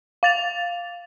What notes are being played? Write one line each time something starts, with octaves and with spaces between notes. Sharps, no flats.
F5 A6 F7